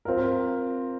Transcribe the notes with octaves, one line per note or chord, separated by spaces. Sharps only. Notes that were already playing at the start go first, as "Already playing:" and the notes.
C4 F4 A#4